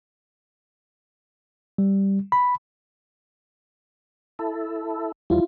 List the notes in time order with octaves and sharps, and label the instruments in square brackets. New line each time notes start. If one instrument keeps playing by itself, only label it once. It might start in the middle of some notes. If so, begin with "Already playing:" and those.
[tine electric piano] G3
B5
[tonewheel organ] E4 A4
[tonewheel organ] E2 F3 G3 [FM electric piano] E4 F4